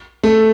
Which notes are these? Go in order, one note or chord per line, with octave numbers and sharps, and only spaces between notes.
A3